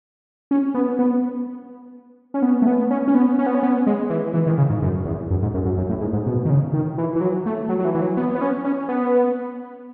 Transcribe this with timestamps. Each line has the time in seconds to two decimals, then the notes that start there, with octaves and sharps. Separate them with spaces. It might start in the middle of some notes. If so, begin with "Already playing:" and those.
0.51 C#4
0.74 B3
0.99 B3
2.34 C#4
2.42 B3
2.62 A3
2.67 B3
2.91 C#4
3.08 C#4
3.15 B3
3.39 C#4
3.46 B3
3.55 C#4
3.63 B3
3.87 G#3
4.10 E3
4.34 E3
4.47 D#3
4.58 C#3
4.70 G#2
4.82 F#2
5.05 E2
5.31 F#2
5.42 G#2
5.54 F#2
5.65 F#2
5.78 F#2
5.90 A2
6.01 G#2
6.13 G#2
6.26 B2
6.45 D#3
6.50 C#3
6.73 D#3
6.98 E3
7.16 E3
7.21 F#3
7.46 A3
7.69 F#3
7.79 F#3
7.85 E3
7.95 E3
8.01 F#3
8.17 B3
8.35 B3
8.41 C#4
8.64 C#4
8.89 B3